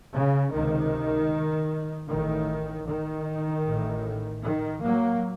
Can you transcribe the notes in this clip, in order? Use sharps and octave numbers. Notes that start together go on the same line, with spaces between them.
C#3
C#2 C3 D#3
A1 A2 D#3
D#3
A1 A2
D#3
F#3 A#3